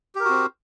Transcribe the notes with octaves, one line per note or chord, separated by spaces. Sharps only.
C4 F#4 G4 A#4